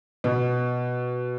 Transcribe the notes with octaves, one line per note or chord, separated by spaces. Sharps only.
B2